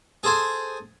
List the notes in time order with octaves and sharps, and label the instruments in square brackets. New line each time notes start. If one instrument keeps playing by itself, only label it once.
[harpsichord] G#4 A4 C5 G#5